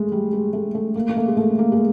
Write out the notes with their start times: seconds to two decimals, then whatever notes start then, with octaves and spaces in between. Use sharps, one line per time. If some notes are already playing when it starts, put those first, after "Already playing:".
Already playing: G#3 A3
0.12 G3
0.33 G#3
0.53 A3
0.75 A3
0.95 A#3
1.09 A#3
1.17 A3
1.28 G#3
1.37 A3
1.59 A#3
1.72 G#3